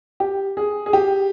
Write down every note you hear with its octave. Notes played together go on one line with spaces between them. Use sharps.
G4
G#4
G#4
G4